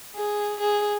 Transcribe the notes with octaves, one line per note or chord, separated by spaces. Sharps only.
G#4
G#4